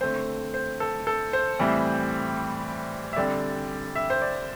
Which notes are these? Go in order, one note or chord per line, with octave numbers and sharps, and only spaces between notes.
D3 A3 C4 C5
C5
A4
A4
C5
A2 E3 G3 C4
E5
D3 G3 C4 D5
E5
C5
D5